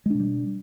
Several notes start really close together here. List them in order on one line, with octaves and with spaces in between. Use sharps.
G#3 D4 B2 G3